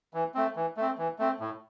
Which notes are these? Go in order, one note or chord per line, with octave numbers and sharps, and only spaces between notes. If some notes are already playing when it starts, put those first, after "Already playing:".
E3
A3 C4
E3
A3 C4
E3
A3 C4
A2